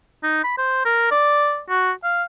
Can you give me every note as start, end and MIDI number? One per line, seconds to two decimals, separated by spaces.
0.23 0.44 63
0.44 0.56 83
0.58 0.83 72
0.85 1.07 70
1.11 1.61 74
1.70 1.92 66
2.03 2.23 77